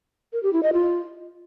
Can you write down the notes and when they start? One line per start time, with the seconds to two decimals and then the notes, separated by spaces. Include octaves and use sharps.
0.33 A#4
0.43 G4
0.53 E4
0.63 D#5
0.73 F4